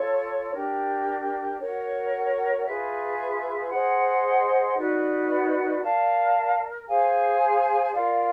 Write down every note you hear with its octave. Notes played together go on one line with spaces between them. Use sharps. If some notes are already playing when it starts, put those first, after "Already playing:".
Already playing: F4 A4 C#5
D4 G4 A#4
F#4 A#4 C#5
F4 G#4 B4 E5
G#4 C5 D#5 F#5
D#4 F#4 B4 D5
A#4 D5 F5 A5
G#4 C5 F5 G#5
F4 A#4 D5 F5